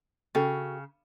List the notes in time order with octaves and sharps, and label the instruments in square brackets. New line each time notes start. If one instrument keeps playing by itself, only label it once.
[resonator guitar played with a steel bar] C#3 [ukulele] F#4 A4 G5